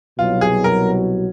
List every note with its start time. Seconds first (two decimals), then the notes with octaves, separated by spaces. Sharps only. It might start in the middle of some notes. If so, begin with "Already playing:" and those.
0.19 C2 B2 F#3 F4
0.41 G#4
0.64 A#4